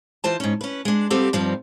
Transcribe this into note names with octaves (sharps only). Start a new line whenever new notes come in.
E3 F4 C5 A5
G#2 C#4
C#4 B4
G#3 D4
G3 B3 C4 F4 G4 A4
G2 F3 G3 C4 D#4